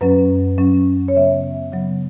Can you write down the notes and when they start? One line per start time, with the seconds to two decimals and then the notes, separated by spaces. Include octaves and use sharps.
0.01 F#2 F#3 C#4 B4
0.58 F#2 F#3 C#4
1.08 C#5
1.16 C#3 F#3 B3 E5
1.73 C#3 F#3 B3